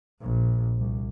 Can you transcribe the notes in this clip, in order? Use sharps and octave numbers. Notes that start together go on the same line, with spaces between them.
A#1
C2